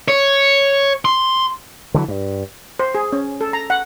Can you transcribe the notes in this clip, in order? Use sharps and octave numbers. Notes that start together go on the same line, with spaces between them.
C#5
C6
D3 E3 F#3
G2
C5
G#4
C#4
A4
A#5
F#5